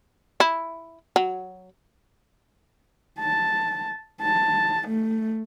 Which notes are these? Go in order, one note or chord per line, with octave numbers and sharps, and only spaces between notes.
E4
F#3
A5
A5
A3